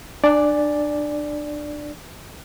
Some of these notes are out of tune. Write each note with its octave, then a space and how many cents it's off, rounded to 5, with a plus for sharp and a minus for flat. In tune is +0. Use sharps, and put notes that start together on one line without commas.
D4 +25 D5 +0 G#5 +0